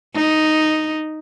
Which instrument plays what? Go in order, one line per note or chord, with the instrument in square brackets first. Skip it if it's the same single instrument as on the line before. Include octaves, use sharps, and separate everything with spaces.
[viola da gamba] D#4